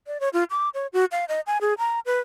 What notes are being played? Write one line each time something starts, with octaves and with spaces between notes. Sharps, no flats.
D5
C#5
F4
D6
C#5
F#4
F5
D#5
G#5
G#4
A#5
B4